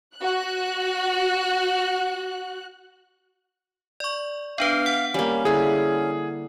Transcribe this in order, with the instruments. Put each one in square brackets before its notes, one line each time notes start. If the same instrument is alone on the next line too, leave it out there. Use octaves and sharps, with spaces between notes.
[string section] F#4 F#6
[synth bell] D5 C#6
[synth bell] B3 D4 B4 [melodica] F5
[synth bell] F#5
[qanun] G3 A#3 [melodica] C#4
[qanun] D3 E4 [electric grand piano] G#4